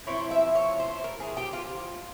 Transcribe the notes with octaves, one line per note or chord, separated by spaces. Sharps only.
F3 C4 E4 C#5
E5
C#5
C5
A#4
G#4
G4
F4